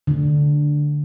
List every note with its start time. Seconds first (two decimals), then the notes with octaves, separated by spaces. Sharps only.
0.07 D3